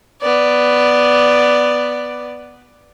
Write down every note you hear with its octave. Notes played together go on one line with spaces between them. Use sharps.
B3 D5